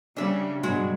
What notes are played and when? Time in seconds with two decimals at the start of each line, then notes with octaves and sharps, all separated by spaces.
0.17 C#3 G3 D4 E5
0.63 G2 B2 F#3 G#3 F#4